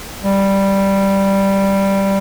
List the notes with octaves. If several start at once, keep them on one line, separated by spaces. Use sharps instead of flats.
G3